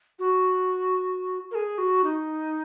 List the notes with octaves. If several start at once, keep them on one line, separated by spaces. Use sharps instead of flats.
F#4
A#4
G#4
F#4
D#4